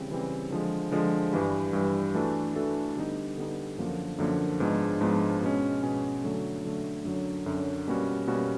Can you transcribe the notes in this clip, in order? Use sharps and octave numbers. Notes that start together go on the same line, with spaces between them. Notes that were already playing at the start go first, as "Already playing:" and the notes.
Already playing: C#3 E3 G3 C4
C#3 E3 G3 C4
D3 F3 G#3
D3 F3 G#3
G2 E3 G3
G2 E3 G3
E3 A3 D4 F#4 A4
E3 A3 D4 F#4 A4
D3 G3 B3 D#4
D3 G3 B3 D#4
F#2 D3 F3 A#3
F#2 D3 F3 A#3
G#2 F3 G#3 B3 D4
G#2 F3 G#3 B3 D4
B2 G#3 C#4
B2 G#3 C#4
D3 F#3 A3
D3 F#3 A3
F#2 D3 F#3
F#2 D3 F#3
B2 G3 A#3 C#4 F#4
B2 G3 A#3 C#4 F#4